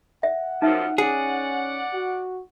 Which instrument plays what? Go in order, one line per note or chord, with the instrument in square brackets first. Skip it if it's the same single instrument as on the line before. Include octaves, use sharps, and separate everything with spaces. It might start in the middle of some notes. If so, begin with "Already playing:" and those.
[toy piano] E5 [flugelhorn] F#5
[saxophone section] F#2 A#2 F3 [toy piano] D#4 E5
[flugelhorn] C#4 [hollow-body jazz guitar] G#4 [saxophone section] D5 F#5
[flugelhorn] F#4